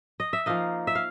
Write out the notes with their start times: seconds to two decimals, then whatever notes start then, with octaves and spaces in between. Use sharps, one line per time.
0.20 D#5
0.33 E5
0.46 F3 A#3 D#4 D#5 F5
0.87 E5
0.95 F5